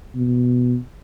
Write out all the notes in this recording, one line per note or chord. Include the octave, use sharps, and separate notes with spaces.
B2